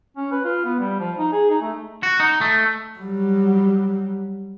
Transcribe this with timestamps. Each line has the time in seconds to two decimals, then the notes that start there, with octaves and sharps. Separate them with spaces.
0.17 C#4
0.31 B4
0.44 F4
0.65 B3
0.80 G3
1.00 F3
1.17 D#4
1.32 G#4
1.50 D#4
1.62 A3
2.03 F#4
2.20 D#4
2.41 A3
2.99 F#3 G3